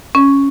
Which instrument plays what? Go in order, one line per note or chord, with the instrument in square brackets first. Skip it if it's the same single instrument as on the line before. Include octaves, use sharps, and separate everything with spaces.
[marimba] C#4